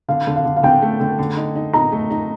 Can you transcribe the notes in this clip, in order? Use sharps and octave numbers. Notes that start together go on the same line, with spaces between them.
D3 F5
D3
F5
D3
F5
D3 G5
A3
D3
D3
D#4
D#4
D#4 A#5
A3
D#4